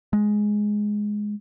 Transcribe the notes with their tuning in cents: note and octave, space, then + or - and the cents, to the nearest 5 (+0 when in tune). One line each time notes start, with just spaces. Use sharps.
G#3 +5